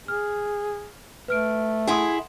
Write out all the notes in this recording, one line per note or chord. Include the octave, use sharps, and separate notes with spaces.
G#4 F6
A3 B4 F6 D7
E4 G#4 F#5 C6 D#6